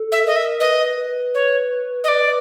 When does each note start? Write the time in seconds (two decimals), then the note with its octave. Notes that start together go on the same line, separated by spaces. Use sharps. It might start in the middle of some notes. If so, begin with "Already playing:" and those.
Already playing: A4
0.12 E5
0.24 A#4 D#5
0.36 E5
0.60 B4 D#5
0.97 B4
1.34 C#5
2.04 D#5
2.08 D5